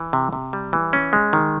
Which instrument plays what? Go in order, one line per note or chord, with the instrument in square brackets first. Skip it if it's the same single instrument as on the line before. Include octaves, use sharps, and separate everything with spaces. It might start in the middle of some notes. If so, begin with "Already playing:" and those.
Already playing: [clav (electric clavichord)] E3
C3
C3
G3
E3
C#4
G#3
D#3